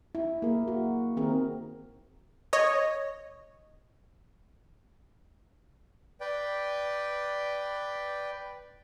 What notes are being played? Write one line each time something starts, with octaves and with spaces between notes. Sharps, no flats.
E4
A#3 G#4 A#4
F#4
D#3 C4 G#4 A#4
C#5 D#5
B4 D5 G5